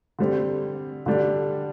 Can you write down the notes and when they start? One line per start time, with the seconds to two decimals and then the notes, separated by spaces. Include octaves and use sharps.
0.19 D3 G3 C4
1.06 D3 G3 D4